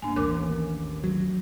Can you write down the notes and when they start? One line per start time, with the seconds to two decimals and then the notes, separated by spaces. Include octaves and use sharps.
0.02 G1 A#3 D4 G#5
0.16 A1 D#2 E3 A#4 D6
1.04 F#3